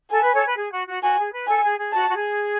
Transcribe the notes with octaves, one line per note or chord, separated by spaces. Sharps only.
A4 G#5
B4
A4 C#5
B4
G#4
F#4
F#4
F#4 G#5
G#4
B4
A4 G#5
G#4
G#4
F#4 A5
F#4
G#4